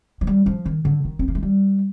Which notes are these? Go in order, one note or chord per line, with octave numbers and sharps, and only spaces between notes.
F3
G3
F3
D#3
D3
D#3
C4
A#3
G#3
G3